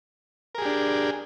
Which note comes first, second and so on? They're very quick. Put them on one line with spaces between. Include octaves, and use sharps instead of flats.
A#4 G#4 G4 D4